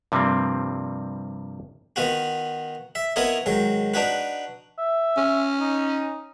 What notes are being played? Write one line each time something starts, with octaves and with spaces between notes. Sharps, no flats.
G2 C3 F3 G3 A#3 C4
D#3 B3 F4 F#4
E5
B3 E4 F4 A#4 C#5 D#5
G#2 D#3 F#3
D4 D#4 F#4 B4
E5
C#4
D#4